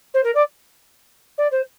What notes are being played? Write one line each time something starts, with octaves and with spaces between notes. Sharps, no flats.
C5
A#4
D5
D5
C5